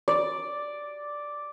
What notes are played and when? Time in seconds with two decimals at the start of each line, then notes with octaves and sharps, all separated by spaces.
0.08 D5